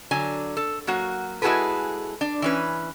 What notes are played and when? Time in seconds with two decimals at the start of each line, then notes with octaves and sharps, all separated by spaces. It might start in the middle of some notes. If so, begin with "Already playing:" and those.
0.11 D3 F#3 G#5
0.57 A4
0.87 F#3 A#3 F#4
1.42 G#3 E4 F#4 G#4 A4 B4
2.21 D4
2.42 E3 C#4 B4